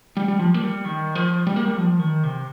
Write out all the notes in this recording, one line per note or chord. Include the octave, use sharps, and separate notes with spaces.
G3
G3
F3
A#3
G3
D#3
F3
G3
A#3
G3
F3
D#3
C3